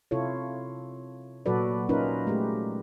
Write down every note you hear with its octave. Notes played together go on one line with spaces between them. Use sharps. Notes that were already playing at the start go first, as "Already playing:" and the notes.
C3 E4 F4 A4 C#5
A#2 F#3 F#4 A4 B4 D5
C#4 D#4 F4 A#4 B4
G#3 A3 G4